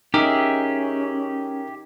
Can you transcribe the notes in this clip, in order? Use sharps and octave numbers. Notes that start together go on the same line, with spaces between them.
C#4 D#4 G4 G#4 A#4 E5